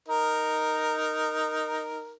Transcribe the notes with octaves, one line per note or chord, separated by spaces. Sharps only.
D#4 A#4